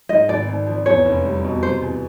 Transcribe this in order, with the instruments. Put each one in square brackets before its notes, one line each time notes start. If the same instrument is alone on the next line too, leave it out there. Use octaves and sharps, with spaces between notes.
[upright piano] G#2 [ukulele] D#5
[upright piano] G#1 [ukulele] D5
[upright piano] G#1
F3
[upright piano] E2 [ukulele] C#5
[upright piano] F1
G3
B2
[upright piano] C3 [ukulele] C5
[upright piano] E2